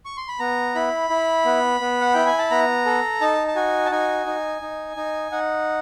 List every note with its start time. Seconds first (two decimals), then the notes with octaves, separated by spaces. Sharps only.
0.05 C#6
0.17 C6
0.28 B5
0.39 B3 A#5
0.75 E4 B5
1.10 E4
1.45 B3
1.80 B3
2.01 F#5
2.14 E4 G5
2.26 G#5
2.38 A5
2.51 B3 A#5
2.86 A4
3.21 D#4 A5
3.47 A5
3.56 F#4 G#5
3.86 A5
3.91 D#4 G#5
4.26 D#4
4.62 D#4
4.97 D#4
5.32 D#4 F#5